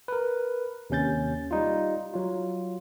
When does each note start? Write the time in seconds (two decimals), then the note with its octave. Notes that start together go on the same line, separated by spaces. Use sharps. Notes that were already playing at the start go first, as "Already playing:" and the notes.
0.08 A#4 B4
0.90 D#2 C3 C#4 G6 A6
1.51 G3 D#4 F4
2.14 F#3 F4